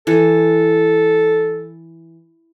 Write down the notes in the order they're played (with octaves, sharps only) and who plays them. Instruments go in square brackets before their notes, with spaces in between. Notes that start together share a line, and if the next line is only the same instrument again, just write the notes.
[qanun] E3 [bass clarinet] A4